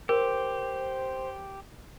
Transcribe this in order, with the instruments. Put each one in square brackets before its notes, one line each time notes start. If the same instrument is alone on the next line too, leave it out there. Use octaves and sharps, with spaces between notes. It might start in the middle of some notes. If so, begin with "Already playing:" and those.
[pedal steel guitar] G4 [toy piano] A#4 [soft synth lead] C5